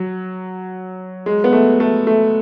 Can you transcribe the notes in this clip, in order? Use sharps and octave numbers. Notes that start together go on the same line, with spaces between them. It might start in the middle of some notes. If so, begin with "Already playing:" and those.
Already playing: F#3
G#3
B3
A3
A3
A3